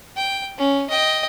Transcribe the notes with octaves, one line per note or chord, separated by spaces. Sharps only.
G5
C#4
D#5 G5